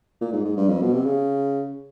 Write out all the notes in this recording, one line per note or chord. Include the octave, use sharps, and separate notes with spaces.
A#2
G#2
G#2
G2
F2
B2
C3
C#3